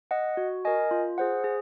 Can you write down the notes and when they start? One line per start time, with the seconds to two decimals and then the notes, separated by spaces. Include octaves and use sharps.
0.11 D#5 F#5
0.37 F#4
0.65 A#4 D#5 G#5
0.91 F4
1.18 G#4 C5 F#5
1.44 G#4